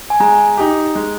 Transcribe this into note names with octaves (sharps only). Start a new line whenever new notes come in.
G#5
G#3 A#5
D#4 G4
G#3